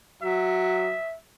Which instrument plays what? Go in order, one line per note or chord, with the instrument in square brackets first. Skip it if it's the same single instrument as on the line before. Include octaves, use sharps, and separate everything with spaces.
[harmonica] F#3 [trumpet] E5